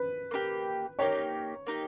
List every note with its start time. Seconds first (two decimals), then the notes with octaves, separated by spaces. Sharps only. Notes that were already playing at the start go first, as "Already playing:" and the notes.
Already playing: B4
0.31 A#3 D#4 G4
0.99 A#3 D#4 G4 C#5
1.67 A#3 D#4 G4